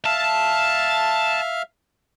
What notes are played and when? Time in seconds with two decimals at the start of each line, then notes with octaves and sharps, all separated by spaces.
0.05 E5 F5 A5 F6